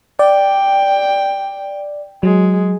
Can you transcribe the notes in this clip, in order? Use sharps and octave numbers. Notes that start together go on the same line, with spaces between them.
D5 G5
F#3 G#3